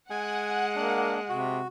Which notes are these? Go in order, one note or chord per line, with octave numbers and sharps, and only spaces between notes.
G#3 F#5 G#5
A#3 D4
C3 F#4